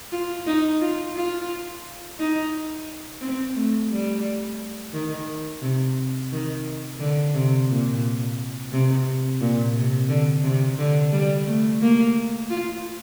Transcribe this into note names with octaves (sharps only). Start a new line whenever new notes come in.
F4
D#4
F4
F4
D#4
C4
A3
G3
D#3
C3
D#3
D3
C3
A#2
C3
A#2
C3
D3
C3
D3
G3
A3
A#3
F4